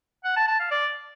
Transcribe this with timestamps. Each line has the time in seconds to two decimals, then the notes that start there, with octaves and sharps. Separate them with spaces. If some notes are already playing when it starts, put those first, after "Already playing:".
0.25 F#5
0.36 A5
0.48 A5
0.59 F5
0.71 D5